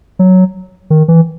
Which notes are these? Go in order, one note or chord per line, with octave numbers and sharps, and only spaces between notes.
F#3
D#3
E3